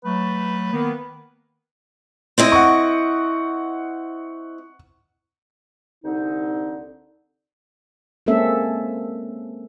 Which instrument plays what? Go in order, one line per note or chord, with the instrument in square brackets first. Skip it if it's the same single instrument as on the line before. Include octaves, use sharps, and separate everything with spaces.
[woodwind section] F#3 A3 [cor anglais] B4
[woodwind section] D#3 A#3 B3
[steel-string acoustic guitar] C4 E4 D#5
[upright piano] F#5 C#6
[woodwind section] C2 D3 C4 D#4
[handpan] G#3 A#3 C4 C#4 A4 E5